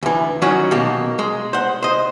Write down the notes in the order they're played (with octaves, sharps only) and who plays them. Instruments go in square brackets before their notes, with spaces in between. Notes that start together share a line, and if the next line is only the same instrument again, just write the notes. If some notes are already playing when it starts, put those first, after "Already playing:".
[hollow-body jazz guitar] D2 E3
D#3 F#3 C#4 F#4
B2 A#3 G4
G#3
C5 F#5
C5 D#5